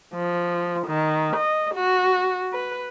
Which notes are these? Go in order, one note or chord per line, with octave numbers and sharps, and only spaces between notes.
F3
D#3
D#5
F#4
B4